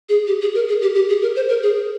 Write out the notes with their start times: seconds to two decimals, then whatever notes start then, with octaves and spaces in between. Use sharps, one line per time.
0.09 G#4
0.27 G4
0.41 G#4
0.55 A#4
0.68 G#4
0.82 G4
0.95 G4
1.09 G#4
1.22 A#4
1.36 C5
1.49 A#4
1.62 G#4